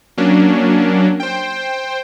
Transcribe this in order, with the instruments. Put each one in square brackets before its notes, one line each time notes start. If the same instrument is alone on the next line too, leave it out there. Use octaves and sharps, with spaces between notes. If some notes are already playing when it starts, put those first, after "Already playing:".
[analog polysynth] F#3 A#3 C#4 D4
C5 G5